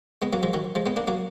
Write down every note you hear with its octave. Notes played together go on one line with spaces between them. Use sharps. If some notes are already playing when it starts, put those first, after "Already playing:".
G#3 B3
F#3 A#3
F3 G#3
D#3 F#3
F3 G#3
G#3 B3
A#3 D4
F#3 A#3